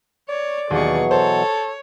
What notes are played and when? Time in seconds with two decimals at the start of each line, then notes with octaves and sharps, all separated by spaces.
0.29 C#5 D5
0.70 D#2 B2 E3 F#3 G#4 C#6
1.11 A4 C5 C#5